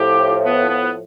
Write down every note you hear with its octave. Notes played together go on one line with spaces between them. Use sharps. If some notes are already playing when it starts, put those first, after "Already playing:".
Already playing: A2 F3 G4
B3
B3